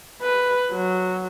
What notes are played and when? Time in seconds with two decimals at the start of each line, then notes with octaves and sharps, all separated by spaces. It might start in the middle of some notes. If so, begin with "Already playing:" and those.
0.22 B4
0.72 F#3